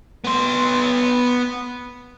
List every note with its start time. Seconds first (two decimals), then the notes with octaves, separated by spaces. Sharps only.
0.24 B3 C6